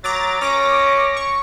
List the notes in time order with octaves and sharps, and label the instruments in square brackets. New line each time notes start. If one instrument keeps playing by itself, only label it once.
[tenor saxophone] F#3 [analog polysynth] A#5 D6 A6
[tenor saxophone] C#4 [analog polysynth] D6 A#6
[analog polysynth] C#6